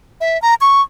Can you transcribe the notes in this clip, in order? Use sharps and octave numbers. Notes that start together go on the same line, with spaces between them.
E5
A#5
C#6